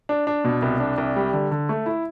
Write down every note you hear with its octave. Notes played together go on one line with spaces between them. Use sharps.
D4
D4
B2
C2
D4
C2
G3
D3
D3
A3
E4